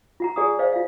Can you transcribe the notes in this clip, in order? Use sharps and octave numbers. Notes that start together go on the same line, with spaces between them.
F4 F#5 A#5
G#4 D5 F#5 G#5 A#5 D#6
C5 D5 D#5 F5 G5
F4 F5